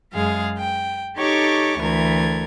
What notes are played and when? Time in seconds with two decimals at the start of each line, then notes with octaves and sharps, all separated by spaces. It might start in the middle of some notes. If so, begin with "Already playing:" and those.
0.13 F#2 G#3 G#4 F5
0.58 G5
1.17 D#4 G4 A4 C#5 C#6 D6
1.80 D2 E3 A3 A#4 G#6